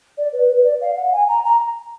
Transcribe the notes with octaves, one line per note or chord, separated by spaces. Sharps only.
D5
B4
B4
D5
F5
F#5
G#5
A#5
A#5